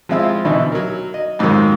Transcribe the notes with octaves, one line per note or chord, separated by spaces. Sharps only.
F3 G#3 C4 E4 F4
B2 D3 E3 D#4 E4
F#3 A#4
D#5
F2 G#2 D#3 F#3 A#3 C4